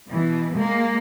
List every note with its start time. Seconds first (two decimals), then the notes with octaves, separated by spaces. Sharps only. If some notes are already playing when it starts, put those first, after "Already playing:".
0.10 B2 E3
0.56 G#3 A#3